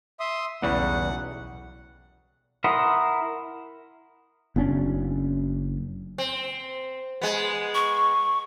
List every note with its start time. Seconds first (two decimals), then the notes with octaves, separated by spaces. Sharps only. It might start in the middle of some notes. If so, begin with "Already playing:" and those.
0.20 E5 C6 D#6
0.62 B1 E2 C#3 G3 F#5
2.64 E4 A#4 F#5 C6 D#6
4.56 F#1 B3 C#4 D4
6.18 C4
7.22 G#3 B3
7.75 C#6